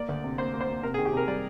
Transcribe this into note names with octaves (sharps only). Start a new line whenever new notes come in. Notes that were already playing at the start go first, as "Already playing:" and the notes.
Already playing: A#3 D5
D2
C3
A#3 C5
A#3
C5
A#3
C3 A#4
G#4
D#3
G4
C3 A#4
G3 D5